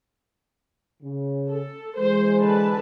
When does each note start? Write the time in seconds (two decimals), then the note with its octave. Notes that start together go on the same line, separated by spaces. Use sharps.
1.02 C#3
1.49 A4
1.97 E3 G#3 C5
2.41 D3 B4 A5